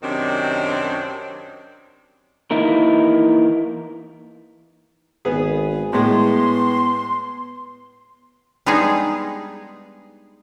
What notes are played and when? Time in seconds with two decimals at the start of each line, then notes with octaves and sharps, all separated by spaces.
0.03 F#2 C3 D#3 F#3 C4 D4
2.51 E3 A#3 D#4 E4 A#4
5.25 G#1 B3 G#4
5.93 A2 G#3 B3 C6
8.66 G3 G#3 B3 D4 D#4 G#4